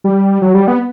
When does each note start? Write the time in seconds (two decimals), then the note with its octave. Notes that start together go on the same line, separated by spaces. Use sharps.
0.04 G3
0.42 F#3
0.54 G3
0.68 B3